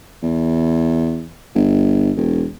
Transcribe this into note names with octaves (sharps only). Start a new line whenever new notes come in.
E2
G1
E1